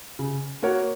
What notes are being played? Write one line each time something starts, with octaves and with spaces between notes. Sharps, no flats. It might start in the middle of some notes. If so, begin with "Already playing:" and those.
C#3
A#3 F#4 A#4 C#5